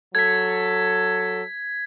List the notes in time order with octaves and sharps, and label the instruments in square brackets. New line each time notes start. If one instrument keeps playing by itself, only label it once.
[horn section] F#3 A4 [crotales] G#6 B6